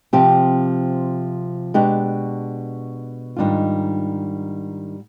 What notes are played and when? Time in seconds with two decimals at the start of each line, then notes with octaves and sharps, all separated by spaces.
0.13 C3 F3 C4 G4
1.74 B2 G#3 D4 G4
3.36 G#2 D#3 G3 D4 F4